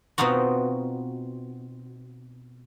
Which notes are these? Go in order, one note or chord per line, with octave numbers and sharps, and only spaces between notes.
B2 C4 D#4 F4 F#4